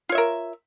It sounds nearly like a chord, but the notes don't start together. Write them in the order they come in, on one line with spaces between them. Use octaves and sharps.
F4 C#5 E5 A#4